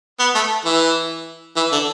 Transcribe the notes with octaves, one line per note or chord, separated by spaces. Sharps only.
B3
A3
E3
E3
D3